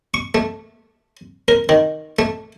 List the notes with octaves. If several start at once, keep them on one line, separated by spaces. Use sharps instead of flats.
C#6
A3
A#4
D#3
A3